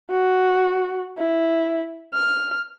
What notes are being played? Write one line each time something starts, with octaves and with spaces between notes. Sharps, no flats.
F#4
E4
F6